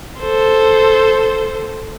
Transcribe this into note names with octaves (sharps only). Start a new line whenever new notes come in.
A4 C5